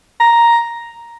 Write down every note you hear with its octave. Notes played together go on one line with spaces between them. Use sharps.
A#5